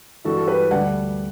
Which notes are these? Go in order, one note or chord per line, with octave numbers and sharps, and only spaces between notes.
G2 E3 G3 F#4 A4
A4
G4 B4
D2 D3 G3 D4 D5 F#5